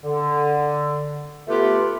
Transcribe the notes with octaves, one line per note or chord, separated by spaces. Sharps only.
D3
A3 B3 F4 G4 B4